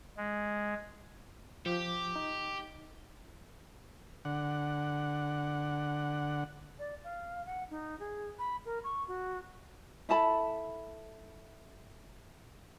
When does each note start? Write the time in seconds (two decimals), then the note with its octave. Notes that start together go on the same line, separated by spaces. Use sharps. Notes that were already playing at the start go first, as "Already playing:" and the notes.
0.17 G#3
1.66 F3 G4
2.16 D#4
4.25 D3 F#5
6.79 D5
7.04 F5
7.46 F#5
7.71 D#4
8.00 G#4
8.39 B5
8.66 A#4
8.84 C#6
9.08 F#4
10.09 E4 A4 A5 B5